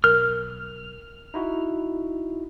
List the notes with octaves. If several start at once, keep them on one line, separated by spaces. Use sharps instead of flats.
B1 A#4 F6
D#4 E4 F#4